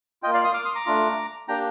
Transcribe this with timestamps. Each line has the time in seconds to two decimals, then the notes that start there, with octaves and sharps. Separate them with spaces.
0.23 F4 D#5 G5
0.27 A#3
0.34 D5 F5
0.44 C6 D#6
0.54 D6 F6
0.65 C6 D#6
0.75 A#5 D6
0.86 A3 D4 F4
1.48 A#3 D4 G4 G5 A#5